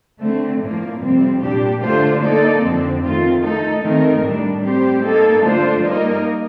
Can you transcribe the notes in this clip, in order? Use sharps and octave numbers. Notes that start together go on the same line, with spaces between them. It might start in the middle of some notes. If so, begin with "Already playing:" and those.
D3 A3 C4
A2 F3 A#3
F2 C3 G3 C4
A#2 G3 D4 G4
D3 A3 D4 F4 C5
A#3 D#4 A4 D5
F2 D3 F3 C4
D#3 A3 C4 F4
A3 D#4 A4
D#3 A3 C4 D#4 A#4
A2 G3 D4
G3 C4 G4 C5
A#3 D#4 A4
D3 A3 D4 F4 C5
G3 A#3 D#4 A#4 D#5